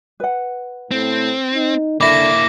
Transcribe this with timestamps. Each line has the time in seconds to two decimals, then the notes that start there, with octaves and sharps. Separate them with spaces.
0.20 B4 F#5
0.91 A2 C4
1.54 D#4
2.01 D3 A#3 E4 E5 B5 D6 A#6